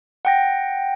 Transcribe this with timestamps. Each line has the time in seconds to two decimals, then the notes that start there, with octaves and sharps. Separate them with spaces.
0.25 F#5 G5 A#6